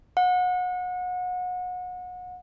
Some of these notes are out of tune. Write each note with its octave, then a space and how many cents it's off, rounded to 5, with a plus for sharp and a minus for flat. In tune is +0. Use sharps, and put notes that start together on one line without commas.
F#5 -30